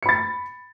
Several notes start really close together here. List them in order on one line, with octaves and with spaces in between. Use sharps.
C#7 B5 A6